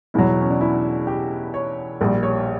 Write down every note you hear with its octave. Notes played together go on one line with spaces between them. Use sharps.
E2 B2 F#3 E4
C#4
D4
E4
G4
C#5
A#1 A#2 G3
C#5